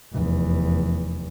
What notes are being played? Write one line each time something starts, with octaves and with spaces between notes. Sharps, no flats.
F1 E2